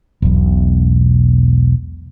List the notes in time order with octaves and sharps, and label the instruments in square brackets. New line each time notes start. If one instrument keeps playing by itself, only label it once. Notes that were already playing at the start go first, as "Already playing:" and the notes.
[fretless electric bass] E1 B1